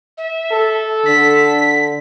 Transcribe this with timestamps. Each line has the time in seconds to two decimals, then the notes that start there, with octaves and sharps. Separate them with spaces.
0.18 E5
0.52 A4
1.06 D3 B6